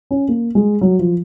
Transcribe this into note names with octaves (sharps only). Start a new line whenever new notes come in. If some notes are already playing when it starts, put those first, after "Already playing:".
C#4
A#3
G#3
F#3
F3